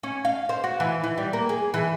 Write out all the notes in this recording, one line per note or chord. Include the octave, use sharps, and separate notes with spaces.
C#4
F5
C5
F#4
E3
E3
G3
A#3
G#4
E3